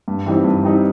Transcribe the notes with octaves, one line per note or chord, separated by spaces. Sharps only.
G2
E3 G3 C4 D#4
G2
E3 G3 C4 D#4